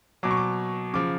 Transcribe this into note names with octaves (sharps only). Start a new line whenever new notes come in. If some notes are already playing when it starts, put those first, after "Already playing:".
B2 F#3 D6
C#6
D6
C#3 F3 D6